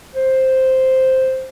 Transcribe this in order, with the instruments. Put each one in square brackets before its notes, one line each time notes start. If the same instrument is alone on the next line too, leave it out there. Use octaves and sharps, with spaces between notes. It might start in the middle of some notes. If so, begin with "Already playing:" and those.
[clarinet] C5